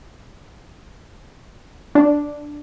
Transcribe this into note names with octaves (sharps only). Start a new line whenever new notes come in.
D4